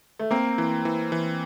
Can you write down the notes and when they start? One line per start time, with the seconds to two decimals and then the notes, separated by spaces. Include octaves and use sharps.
0.19 A3
0.31 A#3 C4
0.58 E3
0.85 E3
1.12 E3